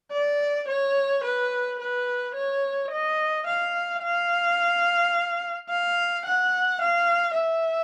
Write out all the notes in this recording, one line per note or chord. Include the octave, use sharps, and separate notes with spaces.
D5
C#5
B4
B4
C#5
D#5
F5
F5
F5
F#5
F5
E5